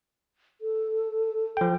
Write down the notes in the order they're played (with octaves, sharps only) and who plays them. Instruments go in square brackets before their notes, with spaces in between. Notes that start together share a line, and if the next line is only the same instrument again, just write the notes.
[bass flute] A4
[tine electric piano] F3 G5